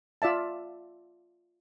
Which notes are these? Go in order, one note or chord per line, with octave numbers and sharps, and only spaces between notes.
F4 D5 E5 A5